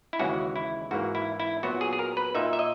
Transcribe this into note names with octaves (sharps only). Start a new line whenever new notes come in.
E4
D#2 C#3 E3 G#3 C#4 F#4
E4
G#2 E3 A#3 F#4
E4
E4
A#2 F#3 B3 F#4
G#4
G#4
A#4
B4
A#2 A#3 D#4 E5
E5
D#5